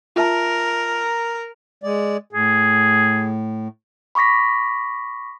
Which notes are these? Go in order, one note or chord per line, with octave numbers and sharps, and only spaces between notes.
F4 A#4 E5 A5
G#3 D5
A2 G#4
B5 C#6 D6 A#6 B6